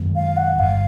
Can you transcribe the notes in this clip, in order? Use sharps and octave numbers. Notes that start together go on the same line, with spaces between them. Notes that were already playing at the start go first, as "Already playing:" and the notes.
Already playing: F#2 D#3 G#3 B3
F5
F#5
G1 G2 D3 F5